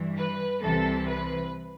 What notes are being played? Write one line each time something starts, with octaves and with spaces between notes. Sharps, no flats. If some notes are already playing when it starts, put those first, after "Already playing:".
Already playing: G2 E3
B4
C2 C3 E3 A4
B4